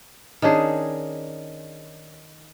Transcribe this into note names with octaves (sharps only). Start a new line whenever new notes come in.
D#3 C#4 D4 G#4